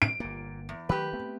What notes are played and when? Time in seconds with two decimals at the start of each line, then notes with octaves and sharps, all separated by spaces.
0.02 D7
0.20 G1 A#2 A#3
0.69 E2
0.89 D#3 F#3 A3 G4 B4
1.13 A3 B3 C4